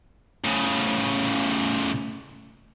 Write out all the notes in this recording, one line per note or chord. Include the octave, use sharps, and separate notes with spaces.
A2 C#3